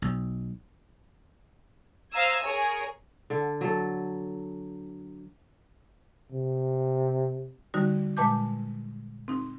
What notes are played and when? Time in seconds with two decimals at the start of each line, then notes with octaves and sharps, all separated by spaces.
0.02 B1
2.12 C5 F5 A#5 D#6 E6 G#6
2.43 G#4 A#4 C#5 G#5
3.30 D3 A4
3.61 F#3 A4
6.32 C3
7.74 D3 G3 D#4 F#4
8.17 A#2 G#3 B4 A5 D6 G6
9.28 C4 D#4